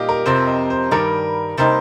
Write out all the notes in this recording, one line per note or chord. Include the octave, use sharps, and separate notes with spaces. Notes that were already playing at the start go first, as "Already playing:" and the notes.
Already playing: A#2 G3 A#3 D#4 G4 D#5 F5
A#4
F2 C3 F3 C4 C5
D#5
C5
G2 D#3 G3 A#4
C3 G3 A#3 D#4 C5